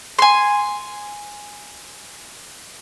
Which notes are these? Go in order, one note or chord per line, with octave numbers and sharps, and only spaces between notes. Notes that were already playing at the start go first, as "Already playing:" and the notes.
G#5 C6